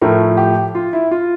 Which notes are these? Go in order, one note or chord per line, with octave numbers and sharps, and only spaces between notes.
A2 F3 A3 A#4
G4
F4
E4
F4